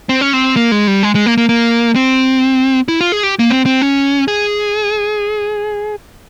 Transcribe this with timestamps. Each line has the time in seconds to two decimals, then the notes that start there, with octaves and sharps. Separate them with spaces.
0.09 C4
0.21 C#4
0.33 C4
0.56 A#3
0.72 G#3
0.87 G3
1.03 G#3
1.15 G#3
1.26 A#3
1.38 A#3
1.49 A#3
1.96 C4
2.88 E4
3.01 F4
3.12 G#4
3.23 G4
3.39 A#3
3.50 C4
3.66 C4
3.82 C#4
4.28 G#4